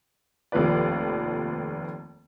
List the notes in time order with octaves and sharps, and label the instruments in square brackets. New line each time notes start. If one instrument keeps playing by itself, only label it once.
[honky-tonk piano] F1 D#2 F3 B4 D5